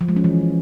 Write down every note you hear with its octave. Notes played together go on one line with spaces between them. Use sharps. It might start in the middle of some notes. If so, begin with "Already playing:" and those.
F3
G#3
C#4
E3